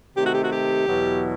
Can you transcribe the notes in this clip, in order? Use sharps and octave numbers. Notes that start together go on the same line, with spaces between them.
C3 D#3 A3 G4
F#4
G4
F#4
G4
E2 B2 F#3 B3 E4